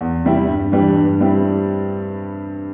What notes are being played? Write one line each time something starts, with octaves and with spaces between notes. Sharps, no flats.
E2
C3 G3 E4
G2
E3 G3 D4
G2
G3 C4 E4